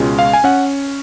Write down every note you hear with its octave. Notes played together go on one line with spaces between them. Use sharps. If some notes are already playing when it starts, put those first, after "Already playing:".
Already playing: C#2 B2 G#3 C#4 F4
F5
G#5
C#4 F#5